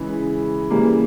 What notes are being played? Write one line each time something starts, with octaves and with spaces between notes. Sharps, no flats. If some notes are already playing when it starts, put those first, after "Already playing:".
Already playing: C#3 E3 G#3 B5
C#3 E3 G3 A#3